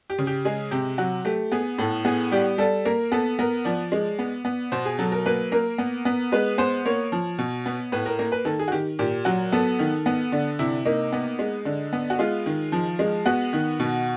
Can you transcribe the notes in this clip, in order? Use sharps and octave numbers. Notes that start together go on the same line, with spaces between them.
G4
C#3
G4
G#3 G#4
C3 G4
F#3 F#4
A3 G4
B3 G#4
A2 A4
B3 G#4
G3 G4
G3 A4
A#3 A#4
B3 A4
B3 A#4
F3 D5
G#3
B3
B3
B2 C5
G#4
F#3 A4
A#4
A#3 B4
A#3 A#4
B3
B3
G#3 B4
B3 C5
A#3 C#5
F3
B2
B3
A2 B4
A#4
A#3 A#4
B4
D#3 A4
G#4
F#4
D#3 G4
A#2 G4
F#3 F#4
B3 A4
D#3
B3
D3
C3 E4
A#3 D#4
B3
G#3
D3
B3
F#4
G#3 F4
D#3
F3
G#3
B3 F#4
D#3
B2